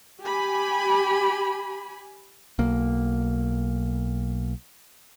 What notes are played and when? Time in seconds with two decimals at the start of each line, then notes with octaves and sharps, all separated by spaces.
0.22 G4 G#5 B5
2.59 B1 A#3